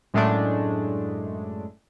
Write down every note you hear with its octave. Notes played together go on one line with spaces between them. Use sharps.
F#2 A2 G#3 A3 D4